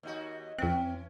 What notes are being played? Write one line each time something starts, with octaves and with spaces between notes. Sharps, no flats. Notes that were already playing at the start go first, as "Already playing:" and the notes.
D#2 D#4 F#4
F2 E3 C4 C#4 F#6